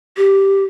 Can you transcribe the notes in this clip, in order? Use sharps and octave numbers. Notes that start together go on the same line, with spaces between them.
G4